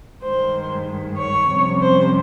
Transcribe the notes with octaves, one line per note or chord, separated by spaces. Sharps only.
G2 D#3 G#3 C5
C#5
F2 C3 G3 C#4
C5